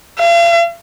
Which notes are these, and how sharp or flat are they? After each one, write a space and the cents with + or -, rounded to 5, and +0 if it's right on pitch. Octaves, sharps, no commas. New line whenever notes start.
F5 -40